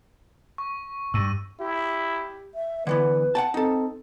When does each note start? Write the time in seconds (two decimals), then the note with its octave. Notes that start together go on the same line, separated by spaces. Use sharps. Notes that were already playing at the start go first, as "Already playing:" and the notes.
0.58 C#6
1.14 G2 E6 D#7
1.60 E4 G4
2.55 E5
2.87 D3 E3 B3 B4
3.35 F#5 G5 A5
3.54 C4 D#4 A4